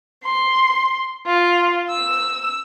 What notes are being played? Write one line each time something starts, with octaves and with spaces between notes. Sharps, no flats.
C6
F4
E6